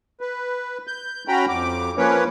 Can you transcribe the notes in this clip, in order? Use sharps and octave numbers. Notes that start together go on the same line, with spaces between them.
B4
G6
C#4 F#4 G5 A#5 B5
F2 D6
F3 A#3 C#4 B4 C#5